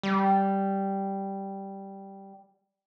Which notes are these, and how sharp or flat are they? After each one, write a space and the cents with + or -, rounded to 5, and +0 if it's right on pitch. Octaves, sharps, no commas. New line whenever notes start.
G3 -5